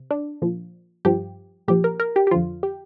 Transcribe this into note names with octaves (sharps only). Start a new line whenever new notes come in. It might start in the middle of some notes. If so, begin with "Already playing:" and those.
Already playing: C3
D4
A#2 F3
G2 F3 G4
A#2 F3 G4
A#4
A#4
G4
G4
F2 D3 F3 F4
G4